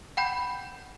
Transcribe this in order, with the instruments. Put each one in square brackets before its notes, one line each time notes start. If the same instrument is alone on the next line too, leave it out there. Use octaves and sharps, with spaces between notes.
[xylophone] F#5 G5 B5 G6